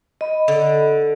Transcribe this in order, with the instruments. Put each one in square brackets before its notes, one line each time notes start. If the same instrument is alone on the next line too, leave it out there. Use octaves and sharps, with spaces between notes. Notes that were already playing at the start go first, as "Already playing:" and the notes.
[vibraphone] D#5 B5
[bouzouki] D3